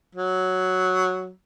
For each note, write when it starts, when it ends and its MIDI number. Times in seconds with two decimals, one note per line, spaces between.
0.15 1.30 54